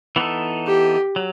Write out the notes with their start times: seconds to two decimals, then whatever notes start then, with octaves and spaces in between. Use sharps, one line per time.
0.16 E3 B3 D#4 A4
0.67 G4
1.16 F#3